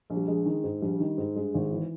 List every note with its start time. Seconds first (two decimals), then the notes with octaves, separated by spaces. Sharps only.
0.10 A#1
0.17 G3
0.28 A#1 G#3
0.46 D#3
0.64 G#2
0.82 A#1 G3
1.00 D#3
1.18 G#2
1.36 G2 G#3
1.54 G#1
1.72 E3